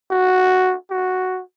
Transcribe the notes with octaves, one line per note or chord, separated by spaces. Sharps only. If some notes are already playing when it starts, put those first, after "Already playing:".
F#4
F#4